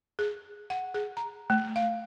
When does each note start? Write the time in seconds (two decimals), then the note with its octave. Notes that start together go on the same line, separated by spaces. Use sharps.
0.19 G#4
0.70 F#5
0.94 G#4
1.17 A#5
1.50 A3
1.76 F5